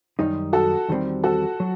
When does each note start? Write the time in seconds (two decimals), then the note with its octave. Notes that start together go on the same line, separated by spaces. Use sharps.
0.19 F#2 D#3 G3 D#4
0.53 F#4 A4
0.88 E2 D#3 G3 C4
1.24 F#4 A4
1.60 F#3